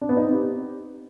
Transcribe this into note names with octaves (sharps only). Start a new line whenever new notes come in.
D4
B3
D#4
C4
G4